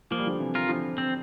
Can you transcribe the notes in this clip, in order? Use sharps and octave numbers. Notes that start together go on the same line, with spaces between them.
F3 A#3
G3
D3 F3
C3 E3
F4 A#4
D3 F3
C4